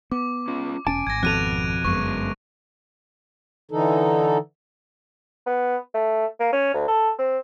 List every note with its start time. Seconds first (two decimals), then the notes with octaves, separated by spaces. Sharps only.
0.12 B3 D6
0.48 C#4 F4
0.87 E1 C#4 G#5 A5 D7
1.07 G#1 G#6 A#6
1.23 F2 B2 A4 F#6 D#7 F7
1.85 G1 F#2 G#3 B3 C#6
3.71 D3 E3 D#4 A4
5.46 B3
5.95 A3
6.40 A#3
6.53 C#4
6.74 D2
6.88 A4
7.19 C4